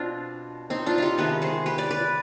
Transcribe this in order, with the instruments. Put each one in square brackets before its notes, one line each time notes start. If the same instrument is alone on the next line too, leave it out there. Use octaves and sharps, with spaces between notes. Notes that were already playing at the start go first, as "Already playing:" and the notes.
Already playing: [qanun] B2 C4 D4 F4
C4 D#4
D4 F4
D#4 F4 G4
C3 D#3 G#3 B3 G4 B4
G#4 C5
G4 B4
B4 D5
B4 D5